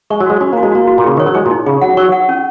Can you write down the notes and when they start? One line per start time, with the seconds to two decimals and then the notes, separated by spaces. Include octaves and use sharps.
0.10 G#3 C#6
0.20 F#3
0.26 G#3 F#4
0.41 C#4 F#4
0.53 A#3 F#4
0.63 G#3
0.72 A#3 F#4
0.87 F#4
0.98 A#2
1.04 C#3 G#4
1.17 D#3 C#5
1.26 F#3
1.35 G#3 G#4
1.46 A#2
1.51 D#4
1.66 C#3 G#4
1.81 F#3 F#5
1.97 F#3 C#6
2.12 F#5
2.29 C#4